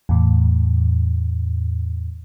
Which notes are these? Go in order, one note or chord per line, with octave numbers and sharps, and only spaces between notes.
E2 A2